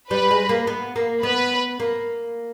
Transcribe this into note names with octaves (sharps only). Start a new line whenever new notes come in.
G3 B4
G#3
A#3
B3
A#3
B3 B4
A#3